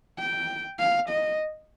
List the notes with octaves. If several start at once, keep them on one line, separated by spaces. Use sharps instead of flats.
G5
F5
D#5